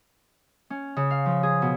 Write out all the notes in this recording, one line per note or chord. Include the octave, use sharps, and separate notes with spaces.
C#4
C#3
F5
F3
G#4
B2